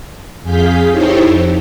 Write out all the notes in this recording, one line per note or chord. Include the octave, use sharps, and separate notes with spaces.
F2 G#4 F5 G6 B6
D#4 E4 G4 A4 C5 C#5
F2